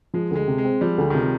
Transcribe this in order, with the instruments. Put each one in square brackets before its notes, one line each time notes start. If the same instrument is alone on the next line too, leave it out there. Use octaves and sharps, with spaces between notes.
[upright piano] F3 [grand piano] G#3
[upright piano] D2 [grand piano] G#3
[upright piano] C3
[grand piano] G#3
[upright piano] C4
[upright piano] F3 [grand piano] G3
[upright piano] D2
[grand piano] D#3
[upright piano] C3 [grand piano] F3